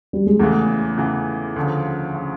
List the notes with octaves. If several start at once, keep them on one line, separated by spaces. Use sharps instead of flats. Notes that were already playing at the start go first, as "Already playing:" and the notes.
G3
G#3
E2 C#3 E3 A3
E2 C#3 E3
D2 C#3 F3
C#3 F3